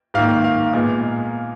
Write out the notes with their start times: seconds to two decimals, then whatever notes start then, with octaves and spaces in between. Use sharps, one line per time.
0.14 G#2 D#3 A#3 F5
0.44 F5
0.73 A#2 G#3 B3